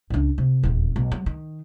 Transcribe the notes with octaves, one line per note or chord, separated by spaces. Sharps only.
C#2 D4
C3
D#1 E2
B1
F#3
D#3